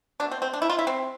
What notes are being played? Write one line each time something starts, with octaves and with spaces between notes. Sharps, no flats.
B2 A3 D4
C4
C4
D4
E4
F4
E4
C4